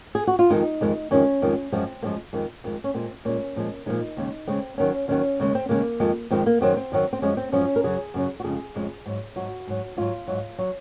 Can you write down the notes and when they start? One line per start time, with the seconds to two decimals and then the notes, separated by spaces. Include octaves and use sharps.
0.15 G#4
0.27 F#4
0.39 F4
0.50 F2 D#3 G#3 D#4
0.81 F2 D#3 G#3
1.11 F2 D#3 G#3 C#4
1.42 F2 D#3 G#3
1.72 F#2 F3 G#3 C4
2.02 F#2 F3 G#3 A#3
2.33 F2 D#3 G#3
2.64 F2 D#3 G#3
2.84 C#4
2.94 A#2 G#3 C4
3.25 A#2 G#3 C#4
3.56 A#2 F3 G#3
3.86 A#2 F3 G#3 D#4
4.17 D#2 C#3 G#3
4.47 D#2 C#3 G#3 C4
4.78 D#2 D#3 F#3 C#4
5.08 D#2 D#3 F#3 C#4
5.40 D#2 C#3 G#3
5.55 C4
5.69 D#2 C#3 G#3 A#3
6.00 F2 D#3 G#3
6.31 F2 D#3 G#3 C4
6.46 A#3
6.61 F#2 D#3 F#3 C4
6.77 C4
6.92 F#2 D#3 F#3
7.13 C4
7.22 F#2 F3 G#3 C#4
7.37 C4
7.52 F#2 F3 G#3 C#4
7.76 A#4
7.84 F#2 C#3 F#3 G#4
8.14 F#2 C#3 F#3
8.40 F#4
8.44 F2 C#3 G#3 G#4
8.75 F2 C#3 G#3
9.06 G#2 F#3
9.36 G#2 F#3 F#4
9.67 G#2 F#3
9.97 G#2 F#3 F4
10.28 G#2 F#3
10.58 F#3